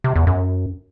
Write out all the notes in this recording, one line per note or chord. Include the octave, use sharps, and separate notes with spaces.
C3
E2
F#2